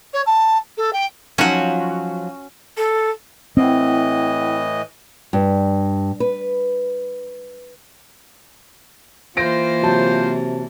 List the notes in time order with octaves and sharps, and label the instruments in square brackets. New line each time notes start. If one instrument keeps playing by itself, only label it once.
[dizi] C#5
A5
A4
G5
[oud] F3 F#3 D#4 [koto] C#4 F#4
[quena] A4
[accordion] A2 E3 D#5 [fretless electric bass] C4 [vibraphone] E4 F#5 G5
[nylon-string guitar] G2
B4
[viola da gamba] E3 A#3 [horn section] F4 C5 [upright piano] A#6 D7
[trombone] C3 [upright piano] F#3 A5